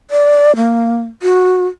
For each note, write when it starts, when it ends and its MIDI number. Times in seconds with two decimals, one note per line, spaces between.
0.11 0.56 74
0.56 1.03 58
1.23 1.67 66